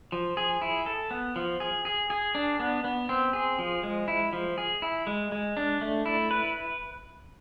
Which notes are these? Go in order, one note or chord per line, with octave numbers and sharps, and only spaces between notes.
F3
G#4
E4
A4
B3
F3
G#4
G#4
G#4
D4
B3
B3
C4
G#4
F3
G#3
E4
F3
G#4
E4
G#3
G#3
D4
A3
E4
B4